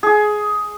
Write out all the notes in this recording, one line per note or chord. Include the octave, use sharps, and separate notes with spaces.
G#4